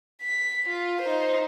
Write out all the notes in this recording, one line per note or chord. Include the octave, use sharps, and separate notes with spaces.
B6
F4
D#4 C5